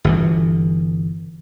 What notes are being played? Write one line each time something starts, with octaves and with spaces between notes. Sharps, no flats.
G1 B2 E3